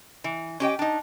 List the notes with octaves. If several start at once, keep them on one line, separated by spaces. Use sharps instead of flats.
E3
C#4 G4 D#5 G5
D4 D#4